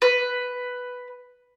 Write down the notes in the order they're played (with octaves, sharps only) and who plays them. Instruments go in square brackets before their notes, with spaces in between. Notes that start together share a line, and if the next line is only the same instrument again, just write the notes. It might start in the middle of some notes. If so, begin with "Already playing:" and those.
[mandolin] B4